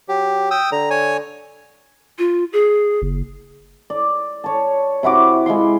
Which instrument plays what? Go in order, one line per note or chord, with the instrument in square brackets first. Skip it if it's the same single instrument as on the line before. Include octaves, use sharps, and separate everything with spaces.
[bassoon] F#3 [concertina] G4
[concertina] G5 D#6 E6
[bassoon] D3 [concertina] A#5
[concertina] C#5 G#5
[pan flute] F4
G#4
[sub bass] F#1
[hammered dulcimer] D5
C#5 A5
C3 E4 F#4 D6
G#3 E4 F4 C6